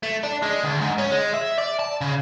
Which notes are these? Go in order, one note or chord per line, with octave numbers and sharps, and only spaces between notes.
A3
D4
G#3
D2
G#2
C#4
G#3
E5
D5
A5
C#3